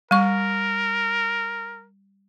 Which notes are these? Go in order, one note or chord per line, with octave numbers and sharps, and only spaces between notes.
G3 A#4 C#6